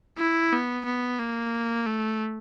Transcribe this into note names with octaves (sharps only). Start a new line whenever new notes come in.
E4
B3
B3
A#3
A3